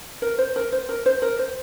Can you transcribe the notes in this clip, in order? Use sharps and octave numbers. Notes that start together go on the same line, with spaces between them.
A#4
C5
A#4
C5
A#4
C5
A#4
C5